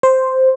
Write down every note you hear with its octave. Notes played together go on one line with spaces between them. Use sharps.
C5